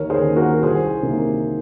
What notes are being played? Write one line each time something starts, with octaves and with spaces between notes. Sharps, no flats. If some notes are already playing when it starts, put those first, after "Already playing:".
Already playing: D#2 A#4 C#5
G#4 C5
D#3 A#3
F#4 A#4
C2 G#4 C5
C3 D#3 F#3 A#3